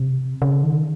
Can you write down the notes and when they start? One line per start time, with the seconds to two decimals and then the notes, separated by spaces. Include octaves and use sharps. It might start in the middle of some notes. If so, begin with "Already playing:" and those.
Already playing: C3
0.42 C#3
0.63 D#3